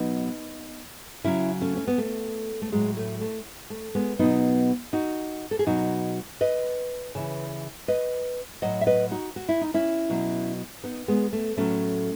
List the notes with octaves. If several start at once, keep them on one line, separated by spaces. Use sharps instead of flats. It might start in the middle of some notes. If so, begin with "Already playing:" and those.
Already playing: B2 F#3 B3 D#4
C#3 F#3 C#4 E4
A3 C#4
C#4
B3
A3
A3
A2 F#3 G#3
A3
A3
A3
G#3 B3
B2 F#3 B3 D#4
D#4 F#4
A4
G#4
B2 F#3 D#4 F#4
B4 D#5
C#3 E3
B4 D#5
A2 F#3 D#5 F#5
E5
B4 D#5
D#4 F#4
F#4
E4
D#4
C#4 E4
B2 F#3
B3 D#4
G#3 B3
A3
A2 F#3 A3 C#4